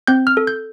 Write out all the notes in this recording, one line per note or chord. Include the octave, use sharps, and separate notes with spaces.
C4 G6
F6
A4
G6